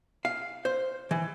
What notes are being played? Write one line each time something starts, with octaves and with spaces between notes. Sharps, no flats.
F5
C5
E3